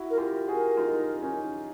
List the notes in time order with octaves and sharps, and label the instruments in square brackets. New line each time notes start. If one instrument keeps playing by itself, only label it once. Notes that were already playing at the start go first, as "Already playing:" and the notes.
Already playing: [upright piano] E4 F#4
[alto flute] A#4
[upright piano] F4 G4
F#4 G#4
[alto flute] A#4
[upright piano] D#4 F4
C#4 D#4